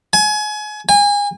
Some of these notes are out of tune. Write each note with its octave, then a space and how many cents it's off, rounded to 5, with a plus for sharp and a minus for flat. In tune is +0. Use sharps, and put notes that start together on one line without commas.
G#5 +30
G#5 -30